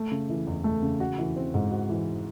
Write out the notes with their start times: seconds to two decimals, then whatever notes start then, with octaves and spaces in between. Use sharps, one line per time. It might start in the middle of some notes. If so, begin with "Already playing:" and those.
Already playing: A3
0.11 C#3
0.30 E3
0.47 E2
0.64 A3
0.82 C#3
1.00 F#4
1.18 E3
1.36 C4
1.54 G#2
1.71 F#4
1.89 E3